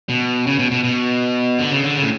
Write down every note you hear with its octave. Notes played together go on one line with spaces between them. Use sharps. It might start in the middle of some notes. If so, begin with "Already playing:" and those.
B2
C#3
B2
B2
B2
D3
C#3
D3
C#3
A2